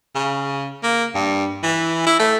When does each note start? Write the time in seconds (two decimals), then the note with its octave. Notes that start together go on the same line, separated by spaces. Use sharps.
0.15 C#3
0.83 A#3
1.14 G2
1.63 E3
2.06 E4
2.19 A3